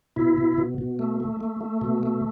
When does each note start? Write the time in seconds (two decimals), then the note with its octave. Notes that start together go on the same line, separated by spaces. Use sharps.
0.16 B2 E4
0.38 B2
0.58 B2
0.78 B2
0.99 A3
1.20 A3
1.41 A3
1.61 A3
1.81 B2
2.03 A3